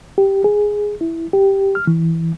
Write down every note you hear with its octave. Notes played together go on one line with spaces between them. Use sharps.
G4
G#4
E4
G4
F6
E3